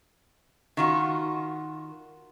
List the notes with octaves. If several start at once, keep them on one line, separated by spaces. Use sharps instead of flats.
D#3 F4 F#4